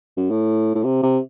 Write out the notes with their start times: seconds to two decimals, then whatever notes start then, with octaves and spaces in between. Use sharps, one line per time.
0.17 F#2
0.30 A2
0.75 A2
0.84 C3
1.03 C3